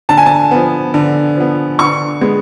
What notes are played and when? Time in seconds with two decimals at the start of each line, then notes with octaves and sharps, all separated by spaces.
0.09 D3 A5
0.17 G#5
0.26 A5
0.51 F3 B3
0.94 D3
1.37 F3 B3
1.79 D3 C#6
2.21 G#3 B3